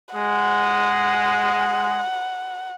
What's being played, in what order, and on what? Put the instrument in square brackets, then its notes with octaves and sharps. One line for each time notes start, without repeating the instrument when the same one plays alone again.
[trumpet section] G#3 [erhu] F#5